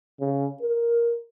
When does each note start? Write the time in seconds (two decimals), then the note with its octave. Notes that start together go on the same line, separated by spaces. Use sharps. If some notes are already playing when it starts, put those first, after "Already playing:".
0.20 C#3
0.62 A#4